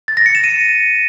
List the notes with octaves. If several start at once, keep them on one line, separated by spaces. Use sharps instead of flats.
A6
A#6
C#7
E7
D#7